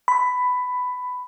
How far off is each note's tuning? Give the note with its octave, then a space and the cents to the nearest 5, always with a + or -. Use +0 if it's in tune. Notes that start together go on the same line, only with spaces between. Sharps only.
B5 +10